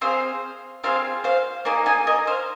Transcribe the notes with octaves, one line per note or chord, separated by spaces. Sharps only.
C4 G#4 C5 F5
C4 F4 G#4 C5 F5
C5 F5
A#3 D#4 G#4 D#5 G#5
D#5 G#5
A#4 D#5
C5 F5